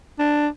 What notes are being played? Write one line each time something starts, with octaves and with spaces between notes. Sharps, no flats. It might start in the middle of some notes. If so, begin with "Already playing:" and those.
D4